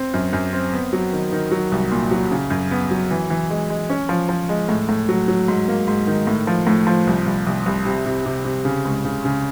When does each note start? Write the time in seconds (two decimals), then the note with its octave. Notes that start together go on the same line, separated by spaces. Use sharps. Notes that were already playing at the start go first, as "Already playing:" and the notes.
Already playing: C4
0.14 F#2
0.33 F#2
0.53 C4
0.73 B3
0.93 F#3
1.13 D#3
1.32 D#3
1.51 F#3
1.72 C2
1.91 A#2
2.11 F#3
2.31 C#3
2.50 F#2
2.71 B3
2.91 F#3
3.11 E3
3.30 E3
3.50 G#3
3.70 G#3
3.90 C#4
4.09 F3
4.29 F3
4.49 G#3
4.69 A2
4.89 A2
5.09 F#3
5.28 F#3
5.48 G#2
5.68 A#3
5.88 G#2
6.07 D#3
6.27 A2
6.47 F3
6.67 A2
6.87 F3
7.07 C2
7.26 C2
7.46 C2
7.66 C2
7.85 C3
8.06 C3
8.26 C3
8.45 C3
8.65 C#3
8.85 C#2
9.05 C#3
9.25 C#3